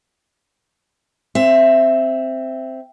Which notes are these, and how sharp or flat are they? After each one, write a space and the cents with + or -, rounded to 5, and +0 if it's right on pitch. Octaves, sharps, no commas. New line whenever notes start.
C4 +0 E5 +10